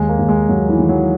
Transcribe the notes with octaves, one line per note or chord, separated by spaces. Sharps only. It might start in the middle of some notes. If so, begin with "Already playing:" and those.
Already playing: D#2 G#3
A#3
D#2
G#3
D#2 F#3
E3
D#3
F#3